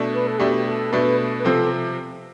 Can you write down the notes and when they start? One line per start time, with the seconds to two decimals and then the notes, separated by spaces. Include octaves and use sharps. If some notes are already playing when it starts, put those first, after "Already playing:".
Already playing: B2 A3 D4
0.14 B4
0.27 A4
0.39 B2 A3 D4 G4
0.66 A4
0.92 B2 A3 D4 B4
1.39 B4
1.45 C3 F3 C4 A4